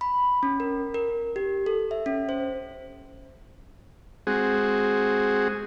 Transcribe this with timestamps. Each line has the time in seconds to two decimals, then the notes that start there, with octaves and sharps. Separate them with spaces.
0.01 B5
0.43 C#4
0.60 A#4
0.94 A#4
1.36 G4
1.66 A4
1.91 E5
2.06 C#4
2.29 C5
4.27 G#3 C4 F#4 G#4